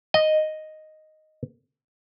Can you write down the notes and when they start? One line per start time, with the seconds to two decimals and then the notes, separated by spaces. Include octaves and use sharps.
0.14 D#5